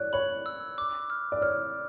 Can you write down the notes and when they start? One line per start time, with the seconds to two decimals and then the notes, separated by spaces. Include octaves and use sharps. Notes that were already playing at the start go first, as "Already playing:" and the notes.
Already playing: C#5 D5 F#6
0.13 C#5 B5
0.46 E6
0.78 D6
1.10 F6
1.32 D5
1.42 C#5 F6